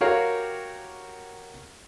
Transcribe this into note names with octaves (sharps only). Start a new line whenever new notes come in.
F#4 G4 A#4 C#5 F5